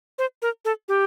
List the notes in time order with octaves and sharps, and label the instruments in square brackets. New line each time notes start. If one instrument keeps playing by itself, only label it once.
[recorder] C5
A#4
A4
G4